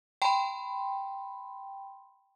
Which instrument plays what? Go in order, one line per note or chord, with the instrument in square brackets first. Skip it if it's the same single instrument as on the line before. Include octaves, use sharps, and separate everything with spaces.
[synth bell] G5 A5 B5 C6